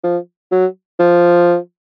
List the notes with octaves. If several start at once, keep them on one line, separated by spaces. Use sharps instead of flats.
F3
F#3
F3